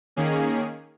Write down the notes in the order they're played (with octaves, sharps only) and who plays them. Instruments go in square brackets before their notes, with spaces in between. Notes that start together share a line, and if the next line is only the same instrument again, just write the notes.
[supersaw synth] D#3 A#3 C#4 G#4